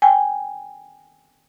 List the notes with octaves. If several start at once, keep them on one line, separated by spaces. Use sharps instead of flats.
G5 G#5